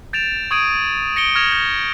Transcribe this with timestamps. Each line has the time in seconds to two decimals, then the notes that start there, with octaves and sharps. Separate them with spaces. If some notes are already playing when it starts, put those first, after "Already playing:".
0.13 G6 A6 D7 E7 F7
0.51 C#6 D#6 G#6 D7 D#7
1.16 A#6 C#7 D7 G7
1.35 C#6 F6 G#6 A#6 E7 F7
1.52 G6